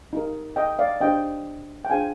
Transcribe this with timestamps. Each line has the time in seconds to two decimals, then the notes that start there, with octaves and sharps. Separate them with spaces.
0.13 D#4 G4 A#4
0.56 D#5 G5
0.79 D5 F5
1.01 D4 G4 C5 D#5 G5
1.85 G5
1.90 D4 F4 G#4 C5 F5 G#5